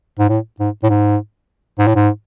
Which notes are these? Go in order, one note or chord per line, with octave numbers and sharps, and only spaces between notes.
G#2
A2
G#2
A2
G#2
G#2
A2
G#2